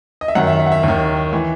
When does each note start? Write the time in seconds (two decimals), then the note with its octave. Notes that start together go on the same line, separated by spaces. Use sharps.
0.21 D#5
0.28 E5
0.35 F#2 D#3 F#5
0.47 E5
0.59 E5
0.66 F#5
0.72 E5
0.83 D#2 D#3
1.33 E3